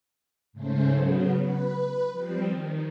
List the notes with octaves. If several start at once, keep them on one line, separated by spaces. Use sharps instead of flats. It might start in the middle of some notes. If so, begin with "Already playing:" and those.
G#2 C#3 A3 C#4 C5
C#3 F#3 B3
B4
B4
F3 G3 C4
D#3